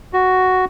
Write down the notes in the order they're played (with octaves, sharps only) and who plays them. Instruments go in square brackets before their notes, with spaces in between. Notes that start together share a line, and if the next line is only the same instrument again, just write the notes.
[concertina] F#4